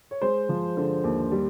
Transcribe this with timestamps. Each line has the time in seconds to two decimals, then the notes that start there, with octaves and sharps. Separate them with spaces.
0.11 C#5
0.22 G#3 C5
0.49 F3
0.77 D3
1.04 D#2
1.31 G3